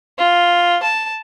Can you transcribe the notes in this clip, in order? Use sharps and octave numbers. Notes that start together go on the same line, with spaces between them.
F4
A5